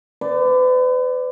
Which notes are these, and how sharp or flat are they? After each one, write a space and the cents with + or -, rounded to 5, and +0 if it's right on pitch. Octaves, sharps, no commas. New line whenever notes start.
B4 +40 D5 +0